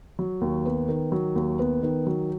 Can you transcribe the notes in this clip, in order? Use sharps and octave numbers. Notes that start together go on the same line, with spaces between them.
F#3
D#2
B3
D#3
F#3
D#2
B3
D#3
F#3